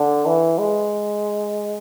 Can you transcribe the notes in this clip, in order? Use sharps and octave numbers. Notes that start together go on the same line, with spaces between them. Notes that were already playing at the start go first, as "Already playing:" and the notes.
Already playing: D3
E3
G#3